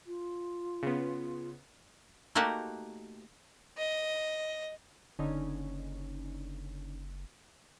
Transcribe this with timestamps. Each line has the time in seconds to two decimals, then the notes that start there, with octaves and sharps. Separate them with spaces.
0.07 F4
0.83 C#3 B3
2.35 A3 A#3 D#4 F#4 G4 F#5
3.77 D#5
5.19 F#1 D3 C#4 D#4